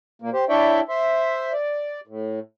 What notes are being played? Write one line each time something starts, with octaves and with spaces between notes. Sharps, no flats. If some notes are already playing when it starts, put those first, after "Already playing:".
A#2 A#3
G4 C5
D4 E4 C#5 D5 E5 G5
C5 E5
D5
A2